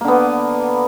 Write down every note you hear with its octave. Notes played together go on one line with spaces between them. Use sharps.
D3 A#3 B3